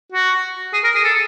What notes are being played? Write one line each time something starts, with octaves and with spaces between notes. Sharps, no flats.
F#4
G#4
A#4
G#4
A4